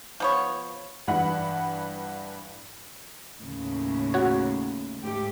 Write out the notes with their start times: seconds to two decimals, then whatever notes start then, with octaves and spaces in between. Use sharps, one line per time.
0.20 F3 B3 C#5
1.08 G2 E3 F#5 B5
3.39 D#2 A2 C#3
4.14 F#4 C#5
5.02 G#2 A3 G4